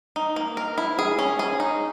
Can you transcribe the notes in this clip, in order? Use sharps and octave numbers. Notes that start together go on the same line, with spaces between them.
D#4
A#3
A#4
E4
G#4
C#4
G#4
D#4